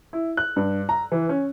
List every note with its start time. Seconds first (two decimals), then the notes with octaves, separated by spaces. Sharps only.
0.13 E4
0.37 F#6
0.56 G2
0.89 A#5
1.12 E3
1.29 C#4